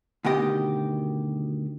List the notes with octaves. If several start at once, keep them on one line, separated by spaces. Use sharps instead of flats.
D2 B2 D#3 G4 D#5